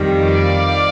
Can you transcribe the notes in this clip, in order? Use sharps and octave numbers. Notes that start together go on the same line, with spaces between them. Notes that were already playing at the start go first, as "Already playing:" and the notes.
Already playing: F2 D#3 G3
D5 F5